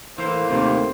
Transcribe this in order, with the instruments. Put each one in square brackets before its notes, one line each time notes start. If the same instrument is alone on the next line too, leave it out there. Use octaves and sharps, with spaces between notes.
[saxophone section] A2 A#3 [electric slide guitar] E3 [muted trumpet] C5
[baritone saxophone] D#2 [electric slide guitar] C3 A3 [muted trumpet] C5